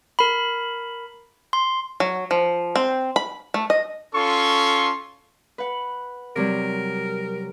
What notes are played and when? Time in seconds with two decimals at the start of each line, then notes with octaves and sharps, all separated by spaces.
0.19 A#4 B5
1.53 C6
2.00 F#3
2.31 F3
2.76 C4
3.16 B5
3.54 A3
3.70 D#5
4.14 C#4 F4 A4 C6 C#6
5.58 B4 F#5
6.36 C3 F#3 G3 A#4